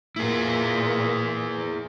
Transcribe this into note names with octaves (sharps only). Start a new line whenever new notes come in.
A#2 E4 G#4